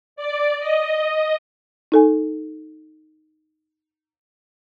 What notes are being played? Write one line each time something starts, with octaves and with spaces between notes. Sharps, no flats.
D5
D#5
D#4 A4 G#5